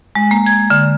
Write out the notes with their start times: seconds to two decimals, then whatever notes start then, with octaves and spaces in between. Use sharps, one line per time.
0.15 G#3
0.31 A#3
0.46 G#6
0.70 D3